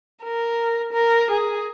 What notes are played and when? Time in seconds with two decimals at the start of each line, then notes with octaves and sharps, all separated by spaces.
0.24 A#4
0.93 A#4
1.31 G#4